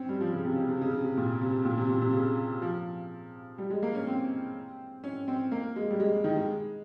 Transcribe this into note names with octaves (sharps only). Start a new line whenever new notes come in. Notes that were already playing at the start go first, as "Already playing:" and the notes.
Already playing: C4 C#4
G3
F3
C#3
C3
C#3
C3
C#3
C3
C3
A#2
C3
A#2
C3
A#2
C3
C#3
F3
G3
G#3
A#3
C#4
C4
C#4
C4
A#3
G#3
G3
G#3
D#3
G#3